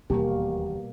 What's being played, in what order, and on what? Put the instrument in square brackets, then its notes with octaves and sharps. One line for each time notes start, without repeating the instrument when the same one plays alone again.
[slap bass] E1 D#2 [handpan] B2 G3 A#3 [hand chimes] G4